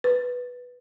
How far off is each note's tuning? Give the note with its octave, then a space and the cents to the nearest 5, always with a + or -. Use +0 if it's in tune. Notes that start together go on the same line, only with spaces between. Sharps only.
B4 -5